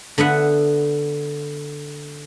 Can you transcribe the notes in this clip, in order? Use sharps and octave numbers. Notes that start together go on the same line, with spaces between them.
D3 B3 E5 F#5